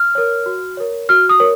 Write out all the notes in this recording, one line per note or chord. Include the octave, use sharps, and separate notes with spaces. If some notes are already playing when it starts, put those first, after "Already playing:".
Already playing: F6
A#4 C#5
F#4
A#4 C#5
F#4 F6
D#6
A#4 C#5